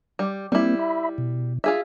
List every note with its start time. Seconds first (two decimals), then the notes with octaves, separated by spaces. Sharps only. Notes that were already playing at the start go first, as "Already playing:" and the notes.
0.19 G3
0.52 G3 A#3 C4 E4
0.79 E5 B5
1.18 B2
1.64 F4 G#4 E5